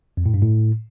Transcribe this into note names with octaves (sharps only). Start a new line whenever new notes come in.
F2
A2
G2
A2